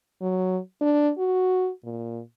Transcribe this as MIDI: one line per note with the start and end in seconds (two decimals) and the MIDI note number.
0.21 0.58 54
0.81 1.10 62
1.18 1.70 66
1.84 2.20 46